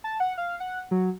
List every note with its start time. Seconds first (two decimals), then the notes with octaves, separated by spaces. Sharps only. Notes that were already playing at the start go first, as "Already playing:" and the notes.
0.04 A5
0.20 F#5
0.38 F5
0.60 F#5
0.91 F#3